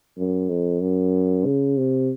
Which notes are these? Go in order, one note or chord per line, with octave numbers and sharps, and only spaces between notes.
F#2
F2
F#2
C#3
C3